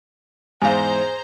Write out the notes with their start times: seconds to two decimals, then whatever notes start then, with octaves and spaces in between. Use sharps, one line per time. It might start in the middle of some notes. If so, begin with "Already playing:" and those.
0.62 E2 G#2 G#4 C5 F5 G#5 A#5